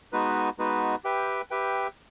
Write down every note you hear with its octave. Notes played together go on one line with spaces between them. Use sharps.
G#3 B3 D#4 F#4 B4
G#3 B3 D#4 F#4 B4
G4 B4 E5 G5
G4 B4 E5 G5